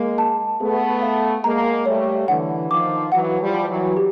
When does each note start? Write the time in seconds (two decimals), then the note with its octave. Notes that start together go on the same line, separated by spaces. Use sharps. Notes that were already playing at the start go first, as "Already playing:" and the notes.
Already playing: G#3 A#3
0.18 A5
0.60 A3 B3 G#4
1.02 F5
1.44 G#3 A#3 A#5
1.86 G3 A3 C#5
2.28 D3 E3 F#5
2.70 D#3 F3 D6
3.12 E3 F#3 F#5
3.40 F3 G3
3.55 B5
3.68 E3 F#3
3.97 G4